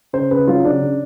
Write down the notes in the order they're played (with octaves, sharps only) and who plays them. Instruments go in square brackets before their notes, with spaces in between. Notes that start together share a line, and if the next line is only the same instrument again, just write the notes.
[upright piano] C#3 C5
C#3 B4
F#3 F4
C#3 D4
C#3